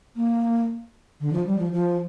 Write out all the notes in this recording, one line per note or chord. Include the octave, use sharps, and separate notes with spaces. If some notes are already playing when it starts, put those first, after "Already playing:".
A#3
D3
F3
G3
F3
F3